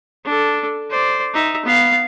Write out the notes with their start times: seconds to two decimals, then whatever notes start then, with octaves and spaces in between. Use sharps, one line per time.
0.25 D4 A4
0.90 C5 D5
1.34 D#4 E5
1.65 B3 F5